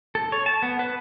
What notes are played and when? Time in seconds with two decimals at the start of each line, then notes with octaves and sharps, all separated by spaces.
0.15 A4
0.32 C#5
0.46 A5
0.62 B3
0.79 B4